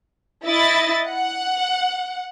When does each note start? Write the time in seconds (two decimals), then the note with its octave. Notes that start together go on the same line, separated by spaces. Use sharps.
0.46 E4 D#5 A6
1.06 F#5